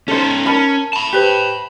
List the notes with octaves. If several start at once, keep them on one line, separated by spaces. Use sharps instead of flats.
C#4 D#4 A4 C5
C#4 A#4 A5 B5
A5 B5
G4 B4 C5